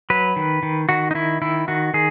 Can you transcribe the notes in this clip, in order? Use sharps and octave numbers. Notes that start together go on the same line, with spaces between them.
F#3 B4
D#3
D#3
D#3 F#4
D#4
D#3 E4
D#3 E4
D#3 F#4
D#3 G#4